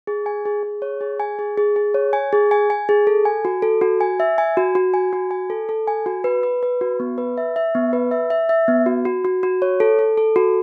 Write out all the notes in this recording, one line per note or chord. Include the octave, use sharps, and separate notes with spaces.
G#4
G#5
G#4
G#4
C#5
G#4
G#5
G#4
G#4
G#4
C#5
G#5
G#4
G#5
G#5
G#4
A4
G#5
F#4
A4
F#4
G#5
E5
G#5
F#4
F#4
G#5
F#4
G#5
A4
A4
G#5
F#4
B4
B4
B4
F#4
B3
B4
E5
E5
B3
B4
E5
E5
E5
B3
F#4
F#4
F#4
F#4
C#5
A4
A4
A4
F#4